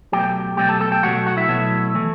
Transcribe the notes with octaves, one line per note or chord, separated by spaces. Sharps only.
B2 F#3 A3 G4 G5
B2 F#3 A3 G4 G5
A4 A5
A4 A5
G4 G5
B2 F#3 A3 F#4 F#5
F#4 F#5
E4 E5
B2 F#3 A3
E3 A3